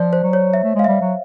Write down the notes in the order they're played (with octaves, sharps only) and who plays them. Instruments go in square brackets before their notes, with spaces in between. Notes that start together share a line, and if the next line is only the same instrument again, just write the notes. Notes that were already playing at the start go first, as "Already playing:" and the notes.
Already playing: [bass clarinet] F3 [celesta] D5
[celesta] C5
[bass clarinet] F#3
[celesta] C#5
E5
[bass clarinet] A3
[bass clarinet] G#3 [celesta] F5
[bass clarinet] G3 [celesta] E5
[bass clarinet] F#3